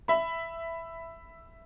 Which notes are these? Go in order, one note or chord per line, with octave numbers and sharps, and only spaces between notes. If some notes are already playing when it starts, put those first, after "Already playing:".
E5 B5